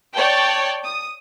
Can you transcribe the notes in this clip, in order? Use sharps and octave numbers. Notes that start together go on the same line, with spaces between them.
C#5 D5 G5 A5
D#6